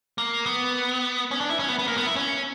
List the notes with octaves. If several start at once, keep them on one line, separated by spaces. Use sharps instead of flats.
A#3
B3
C#4
D4
E4
C#4
B3
B3
A#3
B3
E4
C#4